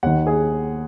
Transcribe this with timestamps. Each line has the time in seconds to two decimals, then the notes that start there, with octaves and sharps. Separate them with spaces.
0.03 D#2 D#3 F#5
0.27 G#4